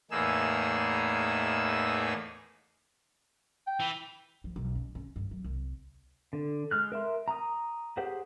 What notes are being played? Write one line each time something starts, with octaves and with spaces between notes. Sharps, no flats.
E2 A2 A#3 D#4 G#4 E6
G5
E3
F3
B1
C#4
C#4
G2
F#3
C2
D3
G#3 F6 F#6
A#4 E5 C6
A#5 D#6
G4 G#4 C5 F#5